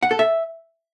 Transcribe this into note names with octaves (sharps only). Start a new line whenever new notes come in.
F#5
A4
E5